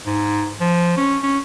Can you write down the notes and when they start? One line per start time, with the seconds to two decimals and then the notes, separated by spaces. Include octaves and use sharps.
0.06 G#2
0.61 F3
0.97 C#4
1.23 C#4